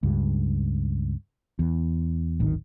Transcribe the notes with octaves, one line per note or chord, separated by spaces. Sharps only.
C#2 G2
E2
D1 G#1 D#3